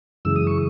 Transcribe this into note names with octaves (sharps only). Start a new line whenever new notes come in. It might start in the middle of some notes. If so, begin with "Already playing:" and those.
F#2 C#3 E3 G#3 E6
D#6
C#6